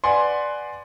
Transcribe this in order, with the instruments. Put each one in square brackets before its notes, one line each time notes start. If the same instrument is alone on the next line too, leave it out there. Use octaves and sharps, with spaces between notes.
[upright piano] B4 D5 F#5 G#5 C6